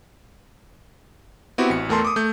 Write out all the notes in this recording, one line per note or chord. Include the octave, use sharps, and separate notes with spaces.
B3 C4 E4 F#4 G4
A1 C#7
E2 A3 A#4 A5 C6
D6 D#6
A3 G6